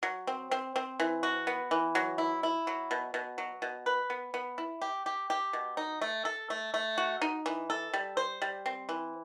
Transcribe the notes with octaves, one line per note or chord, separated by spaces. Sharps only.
F#3
C4
C4
C4
E3
F#4
B3
E3
F#3
E4
E4
F#3
B2
B2
F#3
B2
B4
B3
B3
E4
G4
G4
G4
B2
D#4
A3
A4
A3
A3
F#4
D#4
E3
A4
G3
C5
G3
C4
E3